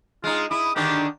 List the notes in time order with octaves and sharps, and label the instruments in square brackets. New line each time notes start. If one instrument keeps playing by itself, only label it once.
[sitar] G#3 D#4 [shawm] F4
[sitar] E4 [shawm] D#6
[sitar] D3 D#3 D4 [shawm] G4